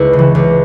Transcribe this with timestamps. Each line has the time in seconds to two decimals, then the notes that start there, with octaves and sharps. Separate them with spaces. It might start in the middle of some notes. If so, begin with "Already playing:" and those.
Already playing: C#2 E4 B4
0.13 C#3
0.19 E3
0.35 C#2